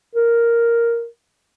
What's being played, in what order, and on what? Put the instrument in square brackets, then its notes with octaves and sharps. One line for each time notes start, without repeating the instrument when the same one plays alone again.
[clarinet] A#4